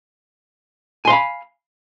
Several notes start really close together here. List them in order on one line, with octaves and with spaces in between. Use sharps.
G#5 C6 F5 B5